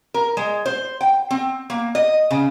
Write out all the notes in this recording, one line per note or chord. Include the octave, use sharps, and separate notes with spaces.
A#4
G#3
C5
G5
C4
A#3
D#5
C#3